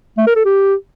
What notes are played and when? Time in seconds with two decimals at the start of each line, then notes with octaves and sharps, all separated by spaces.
0.18 A3
0.27 A#4
0.36 A4
0.45 G4